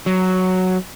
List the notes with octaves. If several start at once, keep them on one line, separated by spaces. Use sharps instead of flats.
F#3